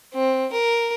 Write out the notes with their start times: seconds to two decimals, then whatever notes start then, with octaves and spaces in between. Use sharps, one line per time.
0.14 C4
0.52 A#4